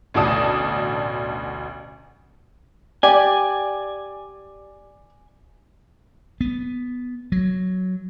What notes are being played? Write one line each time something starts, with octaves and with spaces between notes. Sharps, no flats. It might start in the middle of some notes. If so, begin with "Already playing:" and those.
A1 D2 B2 D5 A5 D#6
G4 D5 G#5
B3
F#3